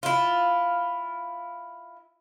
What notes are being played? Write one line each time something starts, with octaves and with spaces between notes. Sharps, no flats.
E4 F4